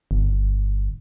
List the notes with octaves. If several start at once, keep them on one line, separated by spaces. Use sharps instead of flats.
G1